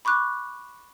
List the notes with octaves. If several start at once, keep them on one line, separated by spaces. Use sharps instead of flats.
B5 C#6 D6 F#6